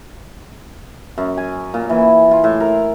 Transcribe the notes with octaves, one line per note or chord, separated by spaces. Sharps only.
F#2
G#5
A#2
E3
F4
A2
A#4